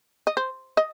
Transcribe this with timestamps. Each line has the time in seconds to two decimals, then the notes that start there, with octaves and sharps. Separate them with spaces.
0.27 D#5
0.37 C5
0.77 D#5